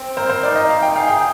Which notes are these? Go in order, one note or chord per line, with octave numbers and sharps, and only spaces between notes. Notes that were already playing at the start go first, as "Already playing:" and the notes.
Already playing: C4
A#4 C5
C5
D#4 D5
D#5
D#4 F5
G5
G#4 F5
G5